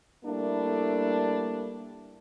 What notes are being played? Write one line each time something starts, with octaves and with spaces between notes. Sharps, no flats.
G3 A3 A#3 D4 E4